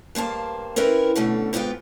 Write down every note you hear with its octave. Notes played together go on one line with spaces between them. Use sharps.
G2 A#3 C5 A5
C4 C#4 E4 A#4 B4
B2 D3 A3 C#4
G#2 B3 E4 F4 G5